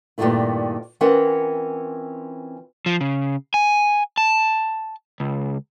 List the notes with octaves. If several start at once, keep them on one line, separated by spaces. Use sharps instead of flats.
G2 A#2 D3 D#3 A3 E4
E3 C4 C#4 F4 A#4 F#5
F3
C#3
G#5
A5
C#2